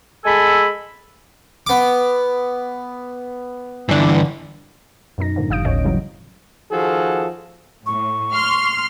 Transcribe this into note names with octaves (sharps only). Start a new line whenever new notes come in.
G#3 A4 G#5 B5 E6
B3 D6
G2 D3 E3 D4
F#2 B2 D#4 A#6
F#2 A2 D3 D#3 F3
G1 G3 F5 D#6 G6 D7
G1 D2 A2 C#4 C#5 D#5
C#3 E3 F#3 G3
D#3 F3 F#4 G#4 A4
A2 C#6
C6 F6